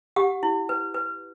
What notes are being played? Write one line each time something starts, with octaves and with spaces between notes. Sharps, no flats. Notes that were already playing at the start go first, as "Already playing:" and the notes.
G4 F#5
E4
B4
B4